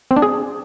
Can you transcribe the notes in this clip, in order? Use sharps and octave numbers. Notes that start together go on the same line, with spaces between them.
C4
D4
G#4